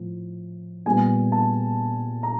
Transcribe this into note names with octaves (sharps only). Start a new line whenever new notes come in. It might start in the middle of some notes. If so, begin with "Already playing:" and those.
Already playing: A2 F3
A#2 G3 B3 G#5
A5
A#5